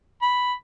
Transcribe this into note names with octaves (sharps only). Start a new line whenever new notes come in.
B5